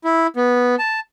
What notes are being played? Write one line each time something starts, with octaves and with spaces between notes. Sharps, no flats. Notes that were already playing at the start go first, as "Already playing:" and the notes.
E4
B3
A5